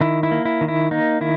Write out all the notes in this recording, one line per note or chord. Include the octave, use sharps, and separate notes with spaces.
D#3 E4
E4
A#3
E4
D#3
E4
A#3 D#4
D#3 E4